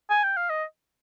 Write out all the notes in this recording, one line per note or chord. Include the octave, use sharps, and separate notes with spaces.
G#5
G5
F5
D#5